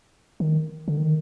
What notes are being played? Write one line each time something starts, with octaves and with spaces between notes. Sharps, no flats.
D#3
D3
D#3